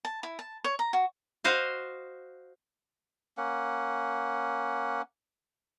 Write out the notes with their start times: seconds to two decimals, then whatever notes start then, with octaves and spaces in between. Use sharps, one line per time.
0.05 A5
0.23 E4
0.39 A5
0.64 C#5
0.79 A#5
0.93 F#4
1.44 F#4 C5 D#5 F5
3.38 A#3 C#4 F#5